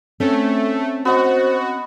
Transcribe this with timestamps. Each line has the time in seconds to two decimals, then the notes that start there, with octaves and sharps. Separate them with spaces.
0.20 A3 C4 C#4
1.05 B3 F#4 C5 D#5